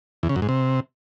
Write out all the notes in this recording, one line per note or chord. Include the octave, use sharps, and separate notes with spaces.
E2
C#3
F#2
G#2
C3